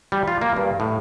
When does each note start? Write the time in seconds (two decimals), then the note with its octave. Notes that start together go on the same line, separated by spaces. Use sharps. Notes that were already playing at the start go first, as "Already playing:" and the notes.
0.12 G3
0.28 F4
0.42 A#3
0.57 G2
0.80 A2